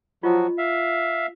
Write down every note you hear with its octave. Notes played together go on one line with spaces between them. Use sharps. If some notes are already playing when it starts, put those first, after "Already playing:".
F3 F#3 F4 F#4 D#5
E5 F5